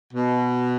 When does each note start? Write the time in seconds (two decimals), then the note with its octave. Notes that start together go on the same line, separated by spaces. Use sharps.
0.14 B2